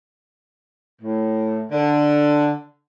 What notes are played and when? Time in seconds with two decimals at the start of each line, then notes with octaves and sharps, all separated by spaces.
1.02 A2
1.72 D3